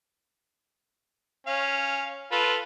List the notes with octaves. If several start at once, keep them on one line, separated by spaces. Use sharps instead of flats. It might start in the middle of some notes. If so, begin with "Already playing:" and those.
C#4 F5
F4 A4 B4